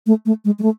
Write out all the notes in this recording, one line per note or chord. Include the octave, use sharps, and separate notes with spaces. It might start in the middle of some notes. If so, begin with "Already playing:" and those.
A3
A3
G#3
G#3
A3